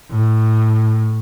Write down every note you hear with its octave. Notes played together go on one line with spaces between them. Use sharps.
A2